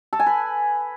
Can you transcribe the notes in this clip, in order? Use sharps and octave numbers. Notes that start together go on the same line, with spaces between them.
A4
G#5
B4